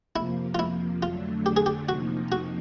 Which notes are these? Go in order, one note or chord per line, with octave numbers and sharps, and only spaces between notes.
F2 C3 F3 A#3 E4
F4
E4
F2 D3 F#3 A3 D4 F4
G4
G#4
G4
F2 C3 F3 A#3 D#4 F#4
F#4